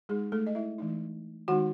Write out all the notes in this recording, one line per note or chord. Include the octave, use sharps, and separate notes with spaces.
G#3 D#4 G#4
A3 A4
D#5
E4 E5
E3 A3 D#4
D#3 G#3 D#4 F#4 F#5